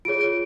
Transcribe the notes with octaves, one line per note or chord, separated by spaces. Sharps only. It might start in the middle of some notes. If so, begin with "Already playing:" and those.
F4 G#4 C#5 D7
D7